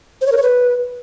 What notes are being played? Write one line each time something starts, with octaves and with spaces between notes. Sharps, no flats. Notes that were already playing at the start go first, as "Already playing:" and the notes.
C5
C#5
A#4
C#5
B4